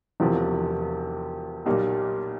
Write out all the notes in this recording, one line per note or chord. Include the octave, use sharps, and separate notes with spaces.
E1 E2 C3 F3
B1 A#2 G3 A#3